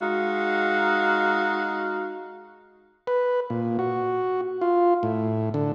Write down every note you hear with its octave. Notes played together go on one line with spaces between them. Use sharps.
G#3 D#4 F#4 F5
B4
A#2
F#4
F4
A2
D3